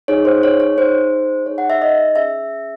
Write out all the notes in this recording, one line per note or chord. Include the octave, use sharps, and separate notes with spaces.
D#4 G#4 C#5
C5
C#5
C#5
D#4 G#4 C5
D#4 G#4 C#5
F#5
E5
D#5
C#4 G#4 E5